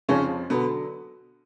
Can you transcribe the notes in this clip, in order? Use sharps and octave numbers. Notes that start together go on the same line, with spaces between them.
F2 C#3 F3 C#4
B2 D3 F#3 B3